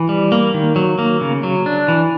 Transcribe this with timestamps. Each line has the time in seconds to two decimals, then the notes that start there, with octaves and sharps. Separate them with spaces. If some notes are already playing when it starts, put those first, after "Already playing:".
Already playing: E3
0.09 G3
0.32 A#3
0.54 D#3
0.76 F#3
0.99 A#3
1.21 C#3
1.43 F#3
1.66 D4
1.88 E3